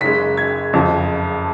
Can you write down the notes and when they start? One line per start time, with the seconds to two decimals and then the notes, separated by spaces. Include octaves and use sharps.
0.01 F#1 F#2 C#3 G#3 B6
0.37 G#6
0.73 F#1 F2 C#3 F3